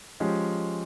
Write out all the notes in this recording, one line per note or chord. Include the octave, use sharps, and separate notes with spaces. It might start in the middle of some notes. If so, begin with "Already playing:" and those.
F3 G#3 C#4 G4